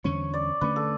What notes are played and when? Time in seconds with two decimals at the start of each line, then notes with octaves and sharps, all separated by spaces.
0.04 E2 D3 G3 C#4 C#5
0.33 D5
0.61 D3 A3 C#4 B4
0.76 A4